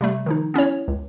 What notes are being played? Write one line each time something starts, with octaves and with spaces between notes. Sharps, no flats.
C3 G3 A3
D#3 F3 D#4
B3 C#4 E4 C#5
C#2